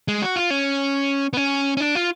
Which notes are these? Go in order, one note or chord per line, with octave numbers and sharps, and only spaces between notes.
G#3
F#4
F4
C#4
B3
C#4
C#4
D4
F4